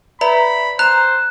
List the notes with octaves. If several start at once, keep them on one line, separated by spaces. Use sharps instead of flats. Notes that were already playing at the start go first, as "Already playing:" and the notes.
B4 D5 E5 A#5 B5
C5 A#5 F#6 E7